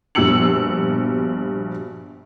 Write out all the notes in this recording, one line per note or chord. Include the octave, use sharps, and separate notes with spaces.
A#1 G2 B2 E6 C#7 F#7